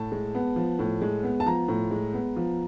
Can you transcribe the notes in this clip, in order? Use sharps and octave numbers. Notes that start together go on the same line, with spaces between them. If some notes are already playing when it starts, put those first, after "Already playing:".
Already playing: A2 A5
G#3
B3
F3
A2
G#3
B3
A5
F3 A#5
A2
G#3
B3
F3